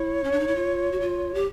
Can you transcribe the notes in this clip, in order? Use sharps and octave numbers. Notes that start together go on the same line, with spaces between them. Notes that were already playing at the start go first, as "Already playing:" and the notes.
Already playing: E4 C#5
C#4
D4
D#4
E4
F4
F#4
F4
G4